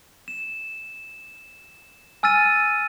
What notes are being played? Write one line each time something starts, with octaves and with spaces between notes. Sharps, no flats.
E7
G#5 E6 F6 A6 D#7